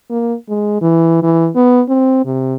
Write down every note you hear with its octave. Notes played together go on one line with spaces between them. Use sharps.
A#3
G#3
E3
E3
B3
C4
C3